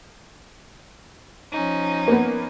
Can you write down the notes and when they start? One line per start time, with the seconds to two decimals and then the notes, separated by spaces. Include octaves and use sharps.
1.52 F3 C#4 D#4
2.08 A#3 B3